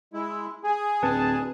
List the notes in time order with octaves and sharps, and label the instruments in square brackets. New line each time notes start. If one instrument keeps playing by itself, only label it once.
[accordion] G#3 E4
G#4 G#5
[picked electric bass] D1 C4 [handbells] B4 [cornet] A5